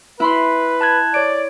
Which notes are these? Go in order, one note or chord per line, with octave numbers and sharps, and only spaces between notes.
E4 B4 B5 C6
A5 F#6 G#6
C#5 D5 D7